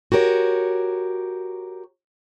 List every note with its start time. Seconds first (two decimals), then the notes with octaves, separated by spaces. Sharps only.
0.12 F#4 G4 A#4 C#5